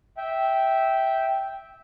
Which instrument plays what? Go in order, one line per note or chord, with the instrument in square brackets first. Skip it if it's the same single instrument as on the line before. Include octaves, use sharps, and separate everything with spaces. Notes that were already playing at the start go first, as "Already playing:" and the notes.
[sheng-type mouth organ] E5 G5